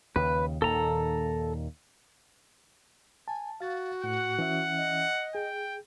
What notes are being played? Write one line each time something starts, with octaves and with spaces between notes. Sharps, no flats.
D#2 C#3 B4
D#2 A#2 D#3 A4 A#5
G#5 A5
F#4 F5 A6
A2 F#5
E3 C#4 E5
D#5
G#4 G5